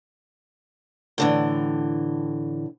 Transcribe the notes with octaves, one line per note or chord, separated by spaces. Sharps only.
A2 D3 E3